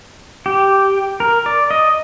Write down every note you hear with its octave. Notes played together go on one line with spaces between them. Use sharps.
G4
A#4
D5
D#5